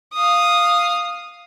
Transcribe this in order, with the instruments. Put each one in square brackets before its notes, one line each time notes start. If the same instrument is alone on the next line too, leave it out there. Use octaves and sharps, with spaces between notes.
[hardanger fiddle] F5 D#6